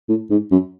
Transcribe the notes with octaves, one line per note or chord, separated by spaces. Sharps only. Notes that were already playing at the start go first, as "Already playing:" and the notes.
A2
G#2
F#2